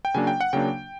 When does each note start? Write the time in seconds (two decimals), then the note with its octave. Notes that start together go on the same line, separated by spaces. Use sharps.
0.05 G5
0.14 C#3 F#3 A#3 D4 G#5
0.27 G5
0.41 F#5
0.53 C#3 F#3 A#3 D4 G5